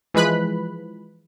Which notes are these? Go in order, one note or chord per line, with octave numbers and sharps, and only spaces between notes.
E3 F3 G#3 B4 B5 F#6